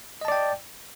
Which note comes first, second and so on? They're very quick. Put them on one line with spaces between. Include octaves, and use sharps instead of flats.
D#5 A5 D5 G5